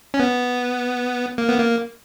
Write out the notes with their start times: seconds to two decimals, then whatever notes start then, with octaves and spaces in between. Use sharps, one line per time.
0.14 C#4
0.19 B3
1.38 A#3
1.49 B3
1.59 A#3